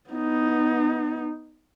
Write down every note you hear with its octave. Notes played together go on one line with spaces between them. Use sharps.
B3 D#4